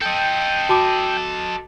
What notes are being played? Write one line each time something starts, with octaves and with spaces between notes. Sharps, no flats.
A4 D#5 G5
F#4 A5 D6